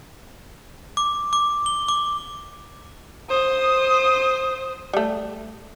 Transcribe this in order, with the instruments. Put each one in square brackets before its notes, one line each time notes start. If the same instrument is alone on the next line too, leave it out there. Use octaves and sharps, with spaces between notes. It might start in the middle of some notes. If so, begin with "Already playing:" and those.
[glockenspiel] D6
D6
G7
D6
[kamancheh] C5 D#6
[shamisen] G3 A3